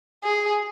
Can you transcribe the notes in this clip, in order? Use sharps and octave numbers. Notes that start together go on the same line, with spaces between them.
G#4